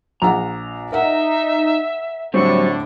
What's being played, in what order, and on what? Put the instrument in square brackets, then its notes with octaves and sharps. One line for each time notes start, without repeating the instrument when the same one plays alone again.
[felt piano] A#1 F#5 [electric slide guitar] A#5
[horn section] D#4 [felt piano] A#4 D#5 F#5 [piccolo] E5
[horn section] A2 D3 [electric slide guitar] F#3 G3 C4 [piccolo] C#6